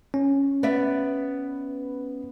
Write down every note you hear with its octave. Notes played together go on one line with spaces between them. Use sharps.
C#4
B3 D5 E5